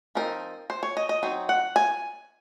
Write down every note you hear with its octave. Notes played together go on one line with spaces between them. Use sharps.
F3 C4 D#4 A#4
C5
C#5
D#5
D#5
F#3 C4 D#4
F#5
G#5